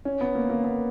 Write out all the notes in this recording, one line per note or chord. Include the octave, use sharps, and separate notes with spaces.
C#4
B3
A#3
A#3
B3